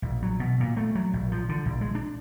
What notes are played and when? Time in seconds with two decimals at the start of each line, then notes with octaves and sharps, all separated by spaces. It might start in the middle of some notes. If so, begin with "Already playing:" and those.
0.02 A#1
0.22 F#3
0.40 B2
0.60 A#2
0.77 A3
0.95 F#3
1.13 A#1
1.32 F3
1.49 D3
1.66 A#1
1.81 G#3
1.95 D4